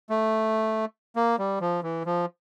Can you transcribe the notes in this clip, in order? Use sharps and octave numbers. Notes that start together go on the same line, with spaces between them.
A3
A#3
G3
F3
E3
F3